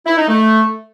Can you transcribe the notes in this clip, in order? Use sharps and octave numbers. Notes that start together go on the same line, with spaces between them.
E4
D#4
A3